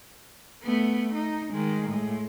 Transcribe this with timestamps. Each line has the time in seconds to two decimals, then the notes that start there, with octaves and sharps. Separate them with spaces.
0.63 A3 B3
1.15 D#4
1.52 D#3 G#3
1.89 A2 G#3